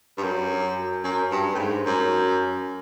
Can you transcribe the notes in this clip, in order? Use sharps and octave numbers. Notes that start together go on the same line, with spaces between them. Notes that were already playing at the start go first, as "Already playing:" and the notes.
G2
F#2
F#2
G2
A2
G#2
F#2